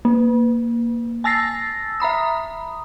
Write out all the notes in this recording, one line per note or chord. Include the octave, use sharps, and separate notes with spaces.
A#3
G#5 A5 E6 A6 A#6 C7
E5 A#5 B5 D#6